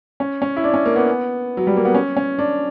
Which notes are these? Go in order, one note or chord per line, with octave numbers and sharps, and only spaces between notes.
C#4
C#4
E4
D4
C#4
A#3
B3
F#3
G3
A#3
B3
C#4
C#4
D4